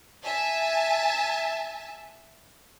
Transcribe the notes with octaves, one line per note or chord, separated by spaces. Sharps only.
E5 G#5 A5